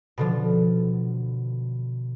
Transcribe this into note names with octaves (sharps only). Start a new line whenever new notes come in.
B2 D3 F3